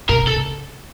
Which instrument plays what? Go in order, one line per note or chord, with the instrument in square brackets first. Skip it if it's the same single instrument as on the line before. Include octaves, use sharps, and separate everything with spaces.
[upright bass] B2 [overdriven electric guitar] A#4
[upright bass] C3 [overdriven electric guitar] A4
[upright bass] C#3